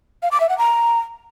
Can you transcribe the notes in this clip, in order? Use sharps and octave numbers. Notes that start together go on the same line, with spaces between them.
F5
D6
E5
F#5
A#5